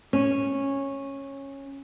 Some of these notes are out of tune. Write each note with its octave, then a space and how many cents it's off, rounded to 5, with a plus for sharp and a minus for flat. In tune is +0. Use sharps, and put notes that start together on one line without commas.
C#4 -10